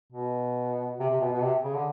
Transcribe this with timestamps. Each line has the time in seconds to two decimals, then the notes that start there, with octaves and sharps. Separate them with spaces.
0.13 B2
1.00 C3
1.10 C3
1.21 B2
1.32 B2
1.42 C3
1.64 C#3
1.75 D3